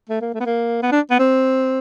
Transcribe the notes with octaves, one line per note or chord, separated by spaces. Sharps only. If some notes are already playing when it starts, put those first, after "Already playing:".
A3
A#3
A3
B3
A#3
B3
D4
B3
C4